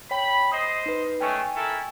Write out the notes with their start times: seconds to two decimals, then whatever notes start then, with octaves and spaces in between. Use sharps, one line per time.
0.11 C#5 G5 B5
0.52 C5 D#5 D#6 C7
0.86 D#4 B4
1.20 G#3 A3 C#4 G5 G#5 C#6
1.56 E4 A4 A#4